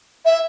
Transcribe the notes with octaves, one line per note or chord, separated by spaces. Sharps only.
E5